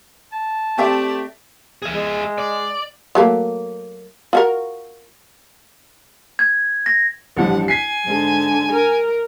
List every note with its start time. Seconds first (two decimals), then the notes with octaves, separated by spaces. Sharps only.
0.32 A5
0.78 A3 C4 G4 D5 E5
1.82 G#4 E5
1.94 G#3
2.38 D5
3.15 F#3 A3 A#3
4.33 F4 F#4 A#4
6.39 G#6
6.86 A#6
7.37 A1 G2 F3 F#5
7.68 G#5 B6 C7
8.04 G#2 D3
8.71 A#4